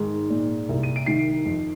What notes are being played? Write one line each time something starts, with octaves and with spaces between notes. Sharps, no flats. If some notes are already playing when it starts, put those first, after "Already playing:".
Already playing: G#2 D#3
A#2
C2
D#7
D7
D#3 C7
F2